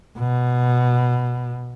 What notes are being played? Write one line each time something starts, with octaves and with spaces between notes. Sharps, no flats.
B2